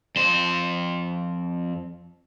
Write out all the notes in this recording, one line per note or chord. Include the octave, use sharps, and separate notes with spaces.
F2 C5